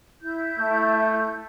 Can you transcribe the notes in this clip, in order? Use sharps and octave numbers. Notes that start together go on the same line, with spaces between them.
E4 G6
A3